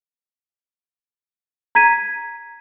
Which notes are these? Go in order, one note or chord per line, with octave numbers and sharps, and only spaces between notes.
A#5 G#6 B6 D#7